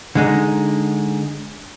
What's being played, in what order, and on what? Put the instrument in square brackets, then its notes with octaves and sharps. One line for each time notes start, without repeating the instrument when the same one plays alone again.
[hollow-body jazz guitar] D3 G#3 D#4